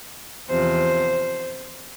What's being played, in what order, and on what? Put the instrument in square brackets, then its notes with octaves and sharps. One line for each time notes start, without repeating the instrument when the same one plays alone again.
[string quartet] E2 C3 F3 C5